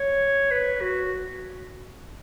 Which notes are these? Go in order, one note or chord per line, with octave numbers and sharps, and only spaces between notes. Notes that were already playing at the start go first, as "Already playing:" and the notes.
Already playing: C#5
B4
F#4